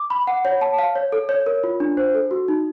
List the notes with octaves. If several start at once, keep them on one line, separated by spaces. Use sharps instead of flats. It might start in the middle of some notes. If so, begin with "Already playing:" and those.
Already playing: D6
B5
F#5
C#5
A5
F5
C#5
A4
C#5
A#4
F4
D4
C5
A4
F#4
D#4